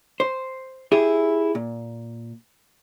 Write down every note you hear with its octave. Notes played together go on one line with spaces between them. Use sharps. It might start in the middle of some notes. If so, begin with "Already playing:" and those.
C5
E4 G4 G#4
A#2